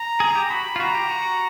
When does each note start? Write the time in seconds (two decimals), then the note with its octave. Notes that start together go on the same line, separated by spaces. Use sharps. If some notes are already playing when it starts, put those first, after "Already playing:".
Already playing: A#5
0.20 G#4
0.35 G4
0.50 F#4 B5
0.76 F4
0.79 F#4 A#5
0.95 G4
1.10 F#4